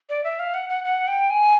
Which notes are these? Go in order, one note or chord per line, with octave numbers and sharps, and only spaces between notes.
D5
E5
F5
F#5
F#5
F#5
G5
G#5